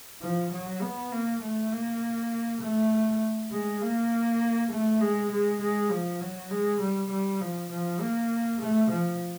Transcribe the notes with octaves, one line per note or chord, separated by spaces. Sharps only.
F3
F#3
B3
A#3
A3
A#3
A3
G#3
A#3
A3
G#3
G#3
G#3
F3
F#3
G#3
G3
G3
F3
F3
A#3
A3
F3